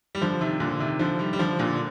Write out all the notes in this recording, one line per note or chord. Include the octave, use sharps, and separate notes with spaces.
G3
D3 F3
C3 D#3
A#2 D3
C3 D#3
D3 F3
D#3 G3
G3
D3 F3
A#2 D3